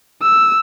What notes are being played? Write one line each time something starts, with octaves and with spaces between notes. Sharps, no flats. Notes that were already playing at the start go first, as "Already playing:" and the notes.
E6